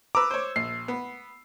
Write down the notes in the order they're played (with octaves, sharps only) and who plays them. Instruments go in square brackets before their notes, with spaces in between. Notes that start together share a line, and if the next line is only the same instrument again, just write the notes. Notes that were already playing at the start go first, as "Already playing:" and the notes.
[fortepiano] B4 A#5 [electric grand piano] D6 E6
[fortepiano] C5 C#5
[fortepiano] A#1 [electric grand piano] C7
[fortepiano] B3